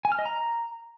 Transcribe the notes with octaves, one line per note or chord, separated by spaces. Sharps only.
G#5
F6
D#5
A#5